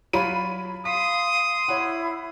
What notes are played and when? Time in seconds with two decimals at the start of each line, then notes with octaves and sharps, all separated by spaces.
0.13 F#3 F4 C#5 B5 D#7
0.85 F5 C6 D#6 B6
1.68 E4 C#5 F#5